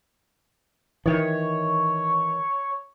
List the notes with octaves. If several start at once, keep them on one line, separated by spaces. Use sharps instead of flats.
D#3 E3 C#5